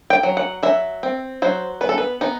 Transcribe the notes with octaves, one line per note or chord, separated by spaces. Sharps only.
G5
F#3
F#5
F#3 E5
C4
F#3 C5
B3 B4
A4
B4
B3 D#4